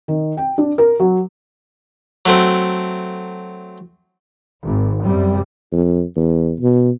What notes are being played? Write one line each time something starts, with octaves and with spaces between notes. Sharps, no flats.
D#3
G5
D4
A#4
F#3
F#3 A3 C4
G#1
F#2 C3 G3
F2
E2
B2